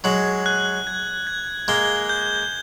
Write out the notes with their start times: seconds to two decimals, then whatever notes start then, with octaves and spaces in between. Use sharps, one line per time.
0.04 F#3 G#3 F#7
0.46 F#6
0.87 G#6
1.27 G#6
1.68 G#3 A#3 G7
2.09 G6